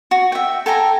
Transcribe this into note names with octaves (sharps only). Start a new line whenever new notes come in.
F#4
E5 G5
A4 G5 G#5 A#5